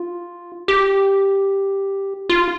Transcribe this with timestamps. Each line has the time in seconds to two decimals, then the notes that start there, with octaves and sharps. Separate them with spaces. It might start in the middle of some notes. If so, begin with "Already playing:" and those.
Already playing: F4
0.68 G4
2.29 F4